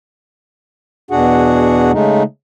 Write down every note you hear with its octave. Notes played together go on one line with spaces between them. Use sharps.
E2 B2 D4 F#4 G#4 F#5
C#3 G#3 A3 D#4